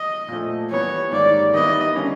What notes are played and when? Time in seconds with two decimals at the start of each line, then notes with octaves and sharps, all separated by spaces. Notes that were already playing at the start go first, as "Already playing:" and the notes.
Already playing: D#5
0.28 A#2 F3 A3
0.71 E3 G3 B3 C#5
1.12 G#2 D#3 G3 A#3 D5
1.54 D#3 G3 B3 E4 D#5
1.96 D3 G3 A#3 C#4